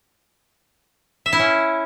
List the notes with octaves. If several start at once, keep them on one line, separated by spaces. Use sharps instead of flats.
E5
E4
C#4